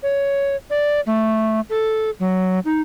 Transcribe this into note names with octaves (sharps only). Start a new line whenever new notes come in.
C#5
D5
A3
A4
F#3
D#4